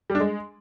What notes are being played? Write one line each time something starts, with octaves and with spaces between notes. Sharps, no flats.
G3
D4
G#3